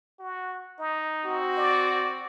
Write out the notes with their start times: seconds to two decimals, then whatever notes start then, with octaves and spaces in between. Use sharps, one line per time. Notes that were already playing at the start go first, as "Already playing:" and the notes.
0.19 F#4
0.79 D#4
1.24 C4 F#4
1.58 D5